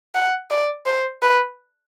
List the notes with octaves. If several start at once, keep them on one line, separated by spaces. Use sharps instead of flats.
F#5
D5
C5
B4